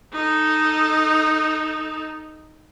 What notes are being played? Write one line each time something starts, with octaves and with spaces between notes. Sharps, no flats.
D#4 A4